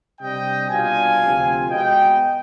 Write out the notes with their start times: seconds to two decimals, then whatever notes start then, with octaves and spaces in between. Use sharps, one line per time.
0.21 C3 G3 D4 D#5 G5
0.70 B2 G3 D4 F4 F5 G#5
1.21 D2 C3 F3 C4 F4
1.69 B2 G#3 B3 D#5 G5